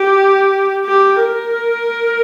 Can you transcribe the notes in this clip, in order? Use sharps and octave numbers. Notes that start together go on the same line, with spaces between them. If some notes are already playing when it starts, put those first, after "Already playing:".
Already playing: G4
G4
A#4